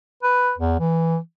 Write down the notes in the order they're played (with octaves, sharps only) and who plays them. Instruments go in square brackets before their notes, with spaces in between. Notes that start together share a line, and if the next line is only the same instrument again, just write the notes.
[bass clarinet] B4
E2
E3